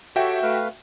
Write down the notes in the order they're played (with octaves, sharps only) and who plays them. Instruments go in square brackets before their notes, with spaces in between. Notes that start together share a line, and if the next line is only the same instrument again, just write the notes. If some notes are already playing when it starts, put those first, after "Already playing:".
[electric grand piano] F#4 E5 G5 [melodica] G4 A4 C#5
[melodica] A3 B4 F5